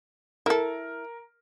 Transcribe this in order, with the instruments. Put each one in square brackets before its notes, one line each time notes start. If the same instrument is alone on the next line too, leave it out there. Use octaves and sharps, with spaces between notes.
[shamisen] E4 A4 [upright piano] A#4